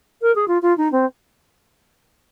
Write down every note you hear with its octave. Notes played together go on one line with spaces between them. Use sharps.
A#4
G#4
F4
F4
D#4
C4